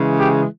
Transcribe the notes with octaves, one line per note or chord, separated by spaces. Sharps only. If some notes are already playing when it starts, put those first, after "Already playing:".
Already playing: C#3 E3 G#3
G4